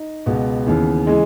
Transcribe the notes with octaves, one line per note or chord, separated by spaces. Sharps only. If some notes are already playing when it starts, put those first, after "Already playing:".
Already playing: D#4
C#2 B2 B3
D#2 C#3 E3
C#3 E3 G#3